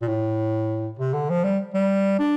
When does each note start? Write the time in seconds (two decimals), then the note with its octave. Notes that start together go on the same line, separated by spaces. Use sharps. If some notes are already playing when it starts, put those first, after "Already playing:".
0.02 A#2
0.08 A2
0.99 C3
1.14 D3
1.30 F3
1.44 G3
1.74 G3
2.19 D4